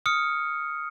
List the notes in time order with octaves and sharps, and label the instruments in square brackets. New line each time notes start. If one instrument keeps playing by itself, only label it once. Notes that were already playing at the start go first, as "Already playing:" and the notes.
[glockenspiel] D#6 F6 C#7